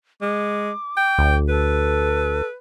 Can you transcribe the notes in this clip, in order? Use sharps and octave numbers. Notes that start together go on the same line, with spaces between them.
G#3 D6
G5
D2
A4 B4